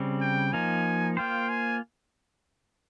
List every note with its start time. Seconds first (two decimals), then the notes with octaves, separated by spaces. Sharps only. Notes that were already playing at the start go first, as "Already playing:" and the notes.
Already playing: C#3 G3 C4
0.21 G5
0.53 F3 A#3 D#4 G#5
1.17 A#3 F4 C5 G5
1.49 G#5